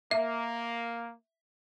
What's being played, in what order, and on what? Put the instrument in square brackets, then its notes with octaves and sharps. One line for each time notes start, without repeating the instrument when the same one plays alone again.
[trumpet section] A#3 [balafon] E5